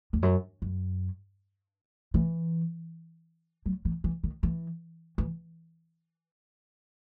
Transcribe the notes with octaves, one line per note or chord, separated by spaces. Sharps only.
E2
F#2
F#2
E3
F#3
E3
E3
D#3
E3
E3